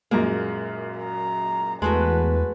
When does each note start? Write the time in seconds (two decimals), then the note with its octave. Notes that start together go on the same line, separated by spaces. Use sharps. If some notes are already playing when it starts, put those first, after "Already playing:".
0.11 F#2 A#2 G#3 A#3
0.99 A#5
1.82 E2 G#3 A3 F#4 B4